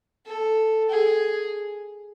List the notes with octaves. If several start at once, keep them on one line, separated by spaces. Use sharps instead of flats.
A4
G#4